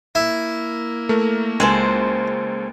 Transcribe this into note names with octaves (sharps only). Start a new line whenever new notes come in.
A#3 E4
A3 A#4
C#2 G#3 A4 C5 G#5